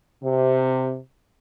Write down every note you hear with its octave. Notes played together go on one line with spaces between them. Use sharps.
C3